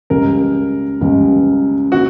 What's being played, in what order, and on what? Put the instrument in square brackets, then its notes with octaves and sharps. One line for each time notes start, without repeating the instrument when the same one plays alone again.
[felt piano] C#2 C#3 G3 [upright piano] A#4
[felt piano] C#2 C#3 G3
[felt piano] D3 A#3 E4 B4 [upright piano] F#4